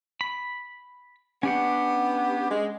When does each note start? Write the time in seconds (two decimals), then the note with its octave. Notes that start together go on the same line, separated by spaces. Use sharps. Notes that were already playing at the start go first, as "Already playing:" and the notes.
0.21 B5
1.43 B3 C#4 D4 G4 F#5
2.51 G#3